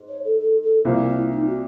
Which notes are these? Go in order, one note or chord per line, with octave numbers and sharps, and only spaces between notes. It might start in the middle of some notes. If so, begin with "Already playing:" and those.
Already playing: G#2
C#5
A4
A4
A4
C2 C3 F3 A#3 E4
E4
D#4
F#4